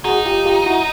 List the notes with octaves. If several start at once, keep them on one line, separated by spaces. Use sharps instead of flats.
D#4 F#4 G#4
F4 G4
F4 G4
E4 F#4